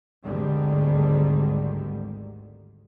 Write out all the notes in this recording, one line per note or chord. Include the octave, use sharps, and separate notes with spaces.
G#1 D2 G#2 D3 D#3 G3